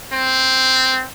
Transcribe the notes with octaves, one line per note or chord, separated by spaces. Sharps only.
C4